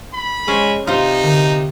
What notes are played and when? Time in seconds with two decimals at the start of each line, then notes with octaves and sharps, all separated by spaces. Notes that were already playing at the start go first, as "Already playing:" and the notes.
0.14 B5
0.48 G#3 C#4 C5
0.87 C3 D#4 F4 C5
1.24 D3